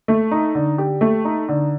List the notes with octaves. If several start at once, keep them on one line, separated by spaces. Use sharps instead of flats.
A3
D#4
D3
G4
A3
D#4
D3